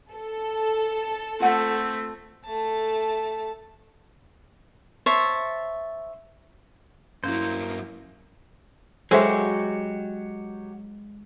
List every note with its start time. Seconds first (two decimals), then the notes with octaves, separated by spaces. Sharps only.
0.12 A4
1.40 A3 C4 F4 F#5
2.46 A3 A5
5.06 C5 C#5 E5 A5
7.24 G2 F#3 A#3 C#4 E4 C5
9.11 F#3 G#3 F#4 G4 A4 C5 E5